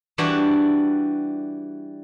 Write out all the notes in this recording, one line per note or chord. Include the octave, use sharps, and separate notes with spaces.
E3 G3 D4 F#4 G5 C6